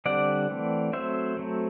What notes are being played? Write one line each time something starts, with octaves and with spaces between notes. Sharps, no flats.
D3 G3 C4 D5 F#5
E3 A3 C4
F#3 A3 C4 C5 E5
F#3 A3 C4